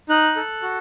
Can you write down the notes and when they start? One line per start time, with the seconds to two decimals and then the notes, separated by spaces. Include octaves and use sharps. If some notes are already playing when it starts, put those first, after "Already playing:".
0.09 D#4 F#6
0.36 A4
0.62 F#4